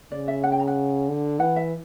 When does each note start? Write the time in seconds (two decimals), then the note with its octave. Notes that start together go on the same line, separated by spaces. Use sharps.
0.12 C#3 D5
0.28 E5
0.44 F#5
0.52 G5
0.60 A#5
0.68 F#5
1.08 D3
1.40 E3 F#5
1.56 E5